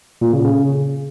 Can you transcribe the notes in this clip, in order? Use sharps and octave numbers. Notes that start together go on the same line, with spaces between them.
A#2
C#3
C#3